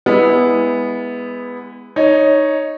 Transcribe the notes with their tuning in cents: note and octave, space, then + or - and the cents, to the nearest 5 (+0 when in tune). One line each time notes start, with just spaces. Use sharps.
G#3 -25 B3 +0 E4 -20
D#4 +0 C#5 +0